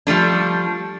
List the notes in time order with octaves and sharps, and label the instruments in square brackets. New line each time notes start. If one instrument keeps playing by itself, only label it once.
[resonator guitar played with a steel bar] F3 G3 A3 D4